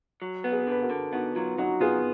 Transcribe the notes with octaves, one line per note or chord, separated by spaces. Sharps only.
F#3
B3
G#4 B4
D3 B4
F#4 A#4
D3
B3 D#4 F#4
F#3 F4
F#3 D#4 F#4
B3 F4 G#4